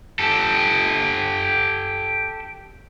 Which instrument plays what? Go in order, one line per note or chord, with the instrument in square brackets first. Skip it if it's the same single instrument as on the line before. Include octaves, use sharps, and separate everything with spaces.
[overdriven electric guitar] G4 A4